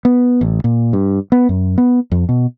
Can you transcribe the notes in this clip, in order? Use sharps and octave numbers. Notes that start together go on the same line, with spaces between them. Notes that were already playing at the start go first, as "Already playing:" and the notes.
B3
A1
A#2
G2
B3
F#2
B3
F2
B2